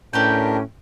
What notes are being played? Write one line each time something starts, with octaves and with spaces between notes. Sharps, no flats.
A2 C#4 D4 G4 A#4 B4 G5